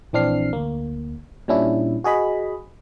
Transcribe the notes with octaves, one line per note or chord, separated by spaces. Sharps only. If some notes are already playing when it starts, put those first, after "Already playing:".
A#1 E3 C4 D4 F6 C7
D2 A#3
A#2 G3 C#4 D4 E4
F#4 G#4 D#5 B5